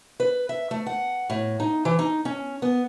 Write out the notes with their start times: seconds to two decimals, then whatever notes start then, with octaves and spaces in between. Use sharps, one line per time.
0.20 B4
0.49 E5
0.71 A3
0.86 F#5
1.30 A2
1.60 D#4
1.85 E3
1.99 D#4
2.25 C#4
2.62 B3